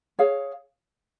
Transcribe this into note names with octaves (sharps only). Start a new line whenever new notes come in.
G#4 C#5 F5